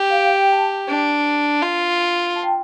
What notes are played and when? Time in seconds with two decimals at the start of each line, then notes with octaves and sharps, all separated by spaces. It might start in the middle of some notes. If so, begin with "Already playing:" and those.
Already playing: G4
0.10 F5
0.16 G5
0.34 G5
0.52 A5
0.89 D4
1.62 F4
2.36 A5
2.43 G5